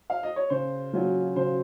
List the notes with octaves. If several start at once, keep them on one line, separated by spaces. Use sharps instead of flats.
F5
D#5
C#5
C#3 C5
F#3 C#4 F4
C#3 C5